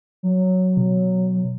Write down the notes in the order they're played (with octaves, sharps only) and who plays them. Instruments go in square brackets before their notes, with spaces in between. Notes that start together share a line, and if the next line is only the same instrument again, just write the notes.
[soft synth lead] F#3
[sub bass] B2